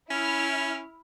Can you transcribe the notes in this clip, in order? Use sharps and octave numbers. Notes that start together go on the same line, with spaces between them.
C#4 E4 F6